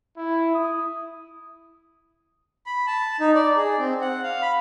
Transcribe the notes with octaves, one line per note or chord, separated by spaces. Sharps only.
E4
D#6
B5
A5
D#4
D5
G#4
C4
F#5
F5
B5